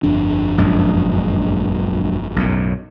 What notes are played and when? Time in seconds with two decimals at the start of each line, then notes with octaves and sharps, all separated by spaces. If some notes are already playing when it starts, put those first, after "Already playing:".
0.03 G1 F2 D4
0.58 A#1 F#2 G#3
2.36 B1 F#2 A2